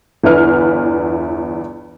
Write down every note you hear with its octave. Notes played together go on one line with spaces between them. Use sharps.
G1 E2 E4 B4 F6